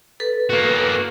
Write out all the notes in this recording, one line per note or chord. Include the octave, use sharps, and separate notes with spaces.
A4 B4
A#3 F#4